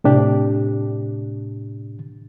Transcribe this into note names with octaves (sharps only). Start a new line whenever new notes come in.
A2 C3 D4 G4